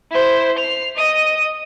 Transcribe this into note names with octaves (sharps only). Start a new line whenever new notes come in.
E4 C5
C7 F7
D#5 D#6